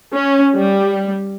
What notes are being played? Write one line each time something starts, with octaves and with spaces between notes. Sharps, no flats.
C#4
G3